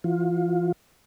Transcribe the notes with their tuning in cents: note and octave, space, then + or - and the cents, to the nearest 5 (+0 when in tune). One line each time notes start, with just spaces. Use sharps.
E3 +45 F4 +25